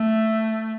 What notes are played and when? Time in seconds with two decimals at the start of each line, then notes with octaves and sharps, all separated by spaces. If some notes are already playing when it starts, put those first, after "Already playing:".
Already playing: A3